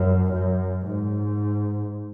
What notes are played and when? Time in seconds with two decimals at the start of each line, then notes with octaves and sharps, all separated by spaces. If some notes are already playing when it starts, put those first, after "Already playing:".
Already playing: F#2
0.34 F#2
0.88 G#2